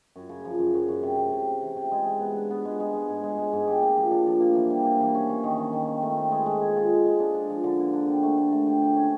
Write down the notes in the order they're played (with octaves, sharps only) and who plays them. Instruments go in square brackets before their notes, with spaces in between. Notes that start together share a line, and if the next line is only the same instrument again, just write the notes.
[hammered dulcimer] F#2
C#3
F3
F#2
F#2
F#2
C3
C3
C3
C3
E3
C3
G#3
G#3
B3
D4
B3
G#3
G#3
G#3
G#2
G#3
G#3
G#2
G4
A#3
F3
D4
F3
A#3
E3
G3
A#3
E3
C#4
E3
D#3
D#3
D#3
C4
A3
C4
G#3
G#3
G#4
F4
G#3
G#3
D4
D4
F3
D3
A#3
D4
G4
A3
A3
A3
G4
G4
C#4